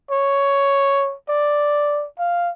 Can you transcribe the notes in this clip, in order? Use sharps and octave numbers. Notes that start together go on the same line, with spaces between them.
C#5
D5
F5